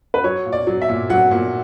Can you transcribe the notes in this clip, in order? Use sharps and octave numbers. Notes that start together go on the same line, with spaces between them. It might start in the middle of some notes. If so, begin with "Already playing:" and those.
B4
F#3 C#5
A#2
D5
F#3
E5
A#2
F#3 F#5
A#2